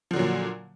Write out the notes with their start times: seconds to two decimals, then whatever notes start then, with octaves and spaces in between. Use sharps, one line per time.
0.11 F3
0.13 D3
0.16 F#3
0.19 A#2